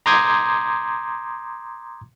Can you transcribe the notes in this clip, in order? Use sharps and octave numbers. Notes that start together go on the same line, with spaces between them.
A#5 C6 D6 D#6 G6 G#6